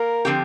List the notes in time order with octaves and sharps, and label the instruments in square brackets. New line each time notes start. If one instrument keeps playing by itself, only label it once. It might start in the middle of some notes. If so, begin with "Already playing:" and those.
Already playing: [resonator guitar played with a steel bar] A#3 [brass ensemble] A#4
[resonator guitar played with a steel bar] D3 F3 C4 G4